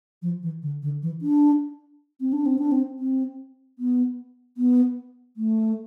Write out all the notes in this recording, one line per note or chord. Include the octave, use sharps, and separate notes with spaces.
F3
E3
D3
D3
E3
D4
C4
D4
C4
D4
C4
C4
B3
B3
A3